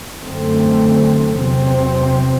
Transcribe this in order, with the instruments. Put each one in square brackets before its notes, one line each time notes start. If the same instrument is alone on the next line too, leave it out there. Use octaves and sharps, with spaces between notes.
[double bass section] F#2 D3 A3 C4
E2 C3 F#3 C4